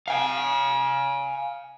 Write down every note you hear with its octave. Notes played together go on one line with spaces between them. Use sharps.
F5 G#5